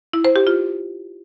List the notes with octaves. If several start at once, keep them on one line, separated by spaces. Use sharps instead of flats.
E4
C5
G4
F4